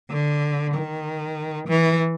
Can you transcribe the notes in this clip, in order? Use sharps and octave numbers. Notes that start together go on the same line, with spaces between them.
D3
D#3
E3